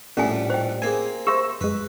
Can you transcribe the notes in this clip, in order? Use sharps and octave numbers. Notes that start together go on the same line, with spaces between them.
A#1 A2 G3 C#4 A4 G#5
C5 D#5 G5
A#3 C4 G#4 G#5
G4 C5 E5 E6
F#2 G#3 B4